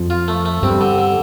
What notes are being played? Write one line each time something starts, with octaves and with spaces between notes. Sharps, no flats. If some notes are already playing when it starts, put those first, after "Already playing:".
Already playing: F2 F3
F4
A3
A3
G2 G3 C4
D3
D3